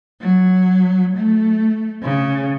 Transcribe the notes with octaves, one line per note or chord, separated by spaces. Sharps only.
F#3
A3
C#3